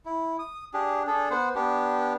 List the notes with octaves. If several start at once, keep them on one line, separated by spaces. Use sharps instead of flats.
E4
D#6
D4 G4 G#4
D4 G#4 A4
B3 C5 F#5
B3 D4 G4